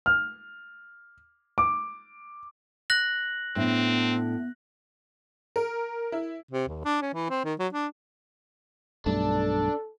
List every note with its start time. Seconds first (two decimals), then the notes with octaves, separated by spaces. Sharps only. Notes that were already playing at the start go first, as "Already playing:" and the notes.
0.06 F6
1.58 D6
2.90 F#6 A#6 F#7
3.56 A2 B3 C4 D4
5.56 A#4
6.12 E4
6.51 C3
6.68 D#2
6.85 D4
7.02 C#4
7.14 E3
7.30 C4
7.45 D#3
7.59 F#3
7.73 D4
9.06 B1 G2 A3 D4 A4